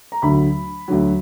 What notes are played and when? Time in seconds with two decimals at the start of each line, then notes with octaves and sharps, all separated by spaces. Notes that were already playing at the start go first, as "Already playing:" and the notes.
0.12 A#5
0.22 D2 D3 F#3 B5
0.88 D2 D3 F#3